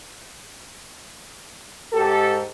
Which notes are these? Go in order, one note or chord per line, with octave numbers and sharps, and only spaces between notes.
G#2 G4 A4